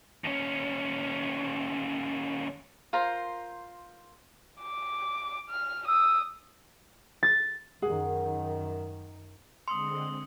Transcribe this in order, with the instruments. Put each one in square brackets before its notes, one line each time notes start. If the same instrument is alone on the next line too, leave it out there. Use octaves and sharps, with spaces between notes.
[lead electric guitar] D#2 C#4
[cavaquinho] F4 A#4 C5 A#5
[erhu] D6
F6
[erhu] D#6 [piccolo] E6
[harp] A6
[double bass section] F#2 D#3 [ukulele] G#4 F#5
[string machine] D3 G#3 C4 [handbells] C6 [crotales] D#6 E6 C#7